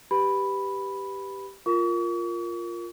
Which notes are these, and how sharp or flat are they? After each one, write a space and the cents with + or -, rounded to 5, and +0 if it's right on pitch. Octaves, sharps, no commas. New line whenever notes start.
G4 +0 B4 +0 B5 +0
F4 +0 A#4 +0 C#6 +45